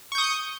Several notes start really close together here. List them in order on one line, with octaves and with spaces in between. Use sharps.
C#6 G6 D#6